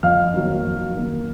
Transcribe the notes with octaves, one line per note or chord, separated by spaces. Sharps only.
F2 F5 F6
D#3 F#3 A#3
F2
D#3 F#3 A#3